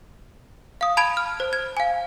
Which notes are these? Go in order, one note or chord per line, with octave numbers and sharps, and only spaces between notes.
F5 D#6
A5 B5 G#6 D7
F6
C5
G#6
F5 G#5